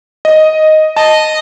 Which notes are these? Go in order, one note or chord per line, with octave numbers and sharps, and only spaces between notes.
D#5
D#5 A5